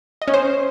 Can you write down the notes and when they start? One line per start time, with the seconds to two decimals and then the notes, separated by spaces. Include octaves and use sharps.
0.22 D#5
0.28 C#4
0.34 C5